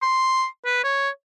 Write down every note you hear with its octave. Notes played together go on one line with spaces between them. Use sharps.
C6
B4
C#5